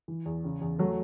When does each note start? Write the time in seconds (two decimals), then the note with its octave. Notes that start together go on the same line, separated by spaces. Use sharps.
0.08 E3
0.26 E2
0.44 C#3
0.61 E2
0.79 F#3 A3